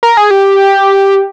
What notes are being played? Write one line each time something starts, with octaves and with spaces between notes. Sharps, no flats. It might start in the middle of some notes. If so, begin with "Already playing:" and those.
A#4
G#4
G4